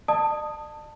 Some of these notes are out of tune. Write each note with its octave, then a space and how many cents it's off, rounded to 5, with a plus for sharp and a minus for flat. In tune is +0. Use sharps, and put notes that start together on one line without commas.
D5 +45 A5 +15 D#6 -5